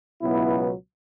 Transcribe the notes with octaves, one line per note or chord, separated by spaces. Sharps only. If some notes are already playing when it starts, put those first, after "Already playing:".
C#2 B2 F#3 B3 E4